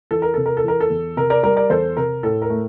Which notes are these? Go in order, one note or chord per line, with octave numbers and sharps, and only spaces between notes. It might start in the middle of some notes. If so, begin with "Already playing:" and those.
E3 A4
A#4
C3 A4
A#4
A4
E3 A#4
A4
E2
C3 A#4
A#4 D5
G3 A#4 D5
A#4 D5
E2 A4 C5
C3 A#4
A2 A4
A#4
A3